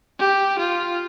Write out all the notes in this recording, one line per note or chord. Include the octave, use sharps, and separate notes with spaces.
G4
F4